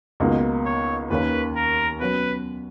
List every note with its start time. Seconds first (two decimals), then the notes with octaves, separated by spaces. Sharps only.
0.20 C#2 B2 A#3 D#4
0.65 C#5
1.10 D#2 D#3 A#3 C#4 B4
1.56 A#4
2.00 B2 F#3 C#4 B4